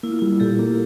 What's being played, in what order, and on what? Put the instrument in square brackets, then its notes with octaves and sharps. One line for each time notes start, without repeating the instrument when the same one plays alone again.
[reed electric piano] A#3 [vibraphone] E4
[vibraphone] F4
[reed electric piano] G3 [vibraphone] E4
[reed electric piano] A#2 [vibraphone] G4 A4
[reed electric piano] A#3